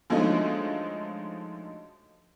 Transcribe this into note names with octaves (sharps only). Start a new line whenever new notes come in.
D3 F3 F#3 G#3 A3 D#4